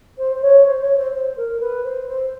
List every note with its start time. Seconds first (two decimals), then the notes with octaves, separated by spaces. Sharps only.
0.18 C5
0.35 C5
0.42 C#5
0.66 C5
0.81 C#5
0.97 C5
1.13 C5
1.36 A#4
1.59 B4
1.83 C5
2.07 C5